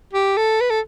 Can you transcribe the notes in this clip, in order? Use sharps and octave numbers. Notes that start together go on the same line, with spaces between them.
G4
A4
B4
A4